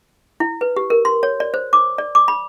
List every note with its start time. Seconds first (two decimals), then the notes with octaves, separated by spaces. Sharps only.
0.40 E4
0.61 B4
0.76 G4
0.90 A#4
1.05 C6
1.23 C#5
1.40 D5
1.54 C5
1.73 D6
1.98 D5
2.15 D6
2.28 B5